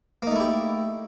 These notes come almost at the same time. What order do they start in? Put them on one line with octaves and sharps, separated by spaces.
A#3 D#4 A3 E4 G4